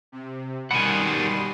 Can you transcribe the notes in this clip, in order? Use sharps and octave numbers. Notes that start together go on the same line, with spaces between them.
C3
B2 D#3 G3 F#5 G#5 C6